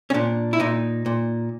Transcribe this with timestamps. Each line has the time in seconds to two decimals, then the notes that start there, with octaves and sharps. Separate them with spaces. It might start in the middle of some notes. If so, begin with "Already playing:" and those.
0.10 C#4
0.14 A#2 D4
0.53 E4
0.60 A#2 D#4
1.06 A#2